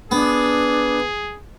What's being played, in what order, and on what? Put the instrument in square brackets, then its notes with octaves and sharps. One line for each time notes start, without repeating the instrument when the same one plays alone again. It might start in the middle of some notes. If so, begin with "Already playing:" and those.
[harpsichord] B3 [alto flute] D4 [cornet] G#4